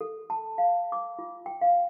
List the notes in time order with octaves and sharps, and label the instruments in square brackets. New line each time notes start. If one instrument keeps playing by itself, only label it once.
[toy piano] A4
A5
F5
D6
F4
G5
F5